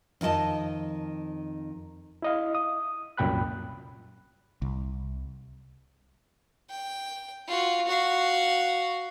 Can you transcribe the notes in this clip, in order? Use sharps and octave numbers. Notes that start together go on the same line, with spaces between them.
F2 D#3 E4 D#5 A5
E4 D#5 F5
D#6
C2 F#2 A#2 G5 B5 F#6
C2
G5
F4 F#4
F#4 F5